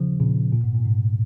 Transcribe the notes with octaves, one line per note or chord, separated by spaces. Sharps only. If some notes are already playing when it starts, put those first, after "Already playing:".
Already playing: C#3 F3
A#2 C#3
A#2
G#2
A#2
G#2 C3